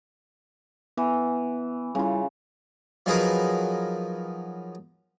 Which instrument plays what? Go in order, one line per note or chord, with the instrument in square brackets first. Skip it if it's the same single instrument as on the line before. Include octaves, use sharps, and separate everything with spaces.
[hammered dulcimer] E3 [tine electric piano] B3
[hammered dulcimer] C#3 F4 [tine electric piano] G3 C#4 E4
[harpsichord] F3 F#3 D#4 G#4 A#4 B4